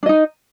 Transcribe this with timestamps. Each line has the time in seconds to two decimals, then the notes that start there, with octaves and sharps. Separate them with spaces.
0.03 D4
0.06 D#5
0.09 D#4